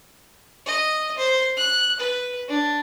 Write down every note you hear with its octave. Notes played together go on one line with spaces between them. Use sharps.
D#5
C5
F#6
B4
D4